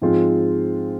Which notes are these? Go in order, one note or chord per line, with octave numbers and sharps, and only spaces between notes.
G#2 F3 G#3 C4 F4